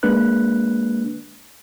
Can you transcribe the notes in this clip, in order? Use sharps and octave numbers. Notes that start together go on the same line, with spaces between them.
G#3 A#3 D4 B4 F#6